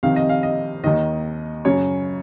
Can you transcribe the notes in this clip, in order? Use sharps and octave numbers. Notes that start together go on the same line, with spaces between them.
F2 C3 D#3 F5
D#5
F5
D#5
D#2 D#3 D#5
F#2 C#3 C#5